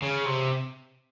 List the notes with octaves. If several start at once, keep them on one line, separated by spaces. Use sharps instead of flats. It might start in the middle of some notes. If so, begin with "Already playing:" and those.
C#3
C3